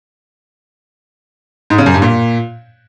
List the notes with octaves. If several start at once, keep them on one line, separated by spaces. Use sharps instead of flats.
G#2
C#3
F#2
G2
A#2